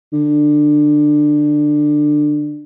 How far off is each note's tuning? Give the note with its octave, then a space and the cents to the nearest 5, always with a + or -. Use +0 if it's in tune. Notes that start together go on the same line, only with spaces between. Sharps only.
D3 +20